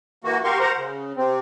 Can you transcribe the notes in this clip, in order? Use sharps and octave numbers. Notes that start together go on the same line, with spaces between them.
E3 A#3 F#4
F#4 G4 A#4 F5 C6 C#6
A#4 C5 F#5 A#5
C#3
C3 C4